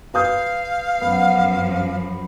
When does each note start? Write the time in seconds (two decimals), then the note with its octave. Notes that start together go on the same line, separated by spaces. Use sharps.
0.14 B4 F5 D#6 G6
1.01 F#2 F3 B3